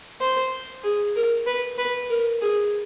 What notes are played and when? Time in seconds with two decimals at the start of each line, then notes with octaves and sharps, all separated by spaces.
0.21 C5
0.84 G#4
1.16 A#4
1.47 B4
1.78 B4
2.10 A#4
2.42 G#4